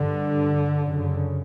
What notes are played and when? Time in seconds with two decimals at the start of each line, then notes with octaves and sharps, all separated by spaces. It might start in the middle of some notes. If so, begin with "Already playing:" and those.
Already playing: G2 D3
0.83 F#2 C#3